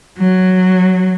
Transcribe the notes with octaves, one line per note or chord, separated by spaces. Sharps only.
F#3